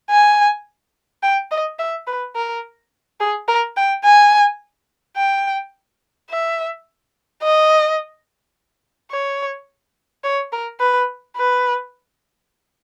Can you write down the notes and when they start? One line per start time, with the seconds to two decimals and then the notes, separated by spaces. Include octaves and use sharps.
0.11 G#5
1.23 G5
1.51 D#5
1.79 E5
2.07 B4
2.36 A#4
3.20 G#4
3.48 A#4
3.77 G5
4.05 G#5
5.17 G5
6.30 E5
7.42 D#5
9.11 C#5
10.24 C#5
10.52 A#4
10.80 B4
11.37 B4